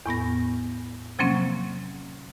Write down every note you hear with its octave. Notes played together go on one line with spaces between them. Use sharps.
E2 A2 B3 A#6
C3 F3 F#3 A#3 C4 C#4